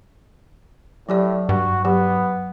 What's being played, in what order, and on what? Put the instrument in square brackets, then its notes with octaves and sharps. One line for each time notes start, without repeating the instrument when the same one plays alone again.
[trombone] A2 [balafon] F#3 G4 D5
[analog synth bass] G2 [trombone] F#4
[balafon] F#3 G4 [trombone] B3